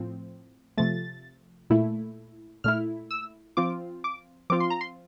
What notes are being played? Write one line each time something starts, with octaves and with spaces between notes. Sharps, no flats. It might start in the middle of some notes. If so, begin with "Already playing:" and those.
Already playing: A2 F3 C4
C3 F3 A3 A6
A#2 A3 E4
A#2 A3 E4 F6
E6
F3 C4 F4 D6
D6
F3 C4 F4 D6
C6
A#5
C6